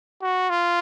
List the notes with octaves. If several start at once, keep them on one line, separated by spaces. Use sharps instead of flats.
F#4
F4